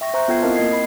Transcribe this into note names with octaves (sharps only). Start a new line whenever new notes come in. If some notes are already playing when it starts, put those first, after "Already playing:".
E5 G5 C#6 A#6
C5 E5 A#5 C#6 F#6 G6
B3 F4 A4 G5 G#6 C7
C4 E4 A#4 D#5 F5 A5
A#3 D#5 G#6 C7
B5 C7